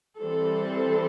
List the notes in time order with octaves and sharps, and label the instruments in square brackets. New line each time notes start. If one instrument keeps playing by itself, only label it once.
[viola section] E3 G3 C4 A4